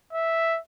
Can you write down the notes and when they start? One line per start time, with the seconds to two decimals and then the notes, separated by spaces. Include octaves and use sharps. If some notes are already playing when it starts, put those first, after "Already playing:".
0.13 E5